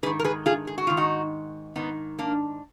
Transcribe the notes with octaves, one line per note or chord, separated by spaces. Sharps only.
G#2 D#3 G#4 B4
A#4
G#4 B4
F4 G#4
G#4
F#4
G#2 D#3 F4
D#4 F#4
G#2 D#3 B3 D#4
A#3 D4